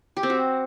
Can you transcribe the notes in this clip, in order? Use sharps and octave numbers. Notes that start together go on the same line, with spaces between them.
G4
C4
F#4